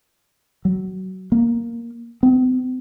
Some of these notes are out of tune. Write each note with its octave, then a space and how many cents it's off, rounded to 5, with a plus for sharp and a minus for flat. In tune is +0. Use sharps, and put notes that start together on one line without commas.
F#3 +20
A#3 +0
C4 -40